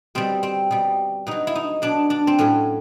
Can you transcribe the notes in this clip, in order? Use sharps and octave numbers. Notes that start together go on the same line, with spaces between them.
B2 G3 C4
C4
B2 G3
B2 F#3 D#4
E4
D#4
B2 F#3 D4
D4
C4
A2 F#3 C#4